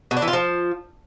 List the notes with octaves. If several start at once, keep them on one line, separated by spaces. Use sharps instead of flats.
B2
D4
E3
F4
F3